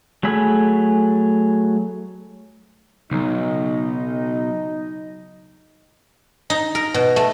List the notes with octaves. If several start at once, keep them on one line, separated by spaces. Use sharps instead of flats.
F#3 A3 G#4 B5 E6
B1 C#3 F#3 D#4 D#5
D#4
A#4
B2
A3